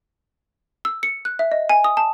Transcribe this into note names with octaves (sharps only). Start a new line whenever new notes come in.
E6
C#7
F#6
E5
D#5
G#5
D#6
A5